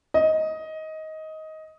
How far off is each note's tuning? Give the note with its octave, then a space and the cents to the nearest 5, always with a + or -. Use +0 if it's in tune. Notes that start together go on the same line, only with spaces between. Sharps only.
D#5 +15